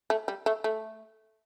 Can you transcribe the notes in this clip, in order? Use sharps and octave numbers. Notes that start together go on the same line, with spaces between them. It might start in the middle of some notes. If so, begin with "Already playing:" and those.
A3
G3
A3
A3